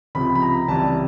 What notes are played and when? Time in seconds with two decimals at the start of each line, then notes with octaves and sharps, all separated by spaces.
0.15 C#2 C3 F3 B5
0.35 B5
0.42 A#5
0.68 C#2 C3 E3 G3 A5